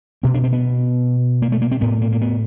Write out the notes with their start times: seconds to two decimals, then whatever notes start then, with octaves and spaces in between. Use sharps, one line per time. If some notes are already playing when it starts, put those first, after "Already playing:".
0.23 B2 C4
0.34 D4
0.44 C4
0.53 B3
1.42 A#3
1.52 A3
1.62 A#3
1.72 C4
1.81 A2 B3
2.02 A#3
2.12 A#3
2.21 B3